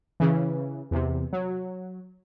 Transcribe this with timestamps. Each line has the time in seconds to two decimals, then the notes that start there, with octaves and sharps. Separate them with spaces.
0.20 C#3 E3
0.91 E2 C3
1.33 F#3